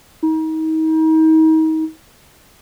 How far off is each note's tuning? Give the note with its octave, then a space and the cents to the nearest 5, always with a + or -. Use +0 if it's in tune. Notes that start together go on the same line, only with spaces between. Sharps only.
D#4 +35